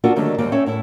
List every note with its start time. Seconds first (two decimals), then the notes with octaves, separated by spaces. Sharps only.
0.04 A#3 D4 F4 F#4 A4 A#4
0.16 D3 D#3 F#3 G3 A3 A4
0.38 D#2 G#2 G3 A#3 C4 G5
0.52 C4 C#4 A4 C#5 E5
0.66 A2 E4 A4